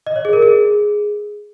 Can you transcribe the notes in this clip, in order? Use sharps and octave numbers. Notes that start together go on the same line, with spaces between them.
D#5
C#5
G#4
A#4
G#4